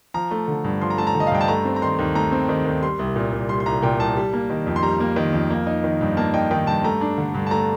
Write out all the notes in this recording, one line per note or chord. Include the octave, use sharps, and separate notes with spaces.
F3 A#5
A3
D3
G2
F3 C6
A#5
A3 A5
A#5
D3
D#5
F5
G2 G5
A5
A3 A#5
C4
A#5
D#3 C6
D#2
A3 A#5
C4
D#3
D#2
G3 C6
C2
A#2
C2
G3 C6
C6
C2 A#5
A#2 G5
C2 A5
G3
A#3
D#3
F2
C6
G3 A#5
A#3
D#3
F2
A#3
D#4
D#3
G2
A#3 A5
D#4 G5
D#3 G5
G2 A5
A3 A#5
D4
D3
G2
A5
A3 A#5